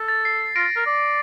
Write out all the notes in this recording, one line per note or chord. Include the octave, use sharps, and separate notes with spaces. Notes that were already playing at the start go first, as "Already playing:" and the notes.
Already playing: A4
A6
C7
F4 A#6 D7
A#4
D5